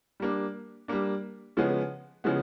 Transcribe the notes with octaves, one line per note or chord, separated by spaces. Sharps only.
G3 A#3 D4
G3 A#3 D4
C#3 F3 G#3 B3
C#3 F3 G#3 B3